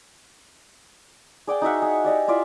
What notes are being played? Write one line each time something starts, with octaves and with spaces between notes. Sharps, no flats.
G#4 D5 F#5 G5
D#4 F#4 E5 F#5
G#4
G4 D5 D#5 G#5
E4 F4 D5 E5